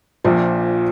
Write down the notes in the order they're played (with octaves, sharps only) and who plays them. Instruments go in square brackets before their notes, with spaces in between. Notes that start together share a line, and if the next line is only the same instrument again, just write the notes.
[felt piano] A#1 A#2 F3